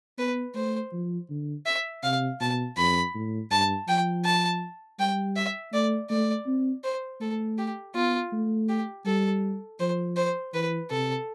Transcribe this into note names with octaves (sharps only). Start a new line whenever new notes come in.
B3 B4
A3 C5
F3
D3
E5
C3 F5
B2 A5
F2 B5
A2
G2 A5
F3 G5
A5
G3 G5
E5
A3 D5
A3 D5
C4
C5
A3 A4
G4
B3 F4
A3
G4
G3 A4
F3 C5
C5
E3 B4
C3 A4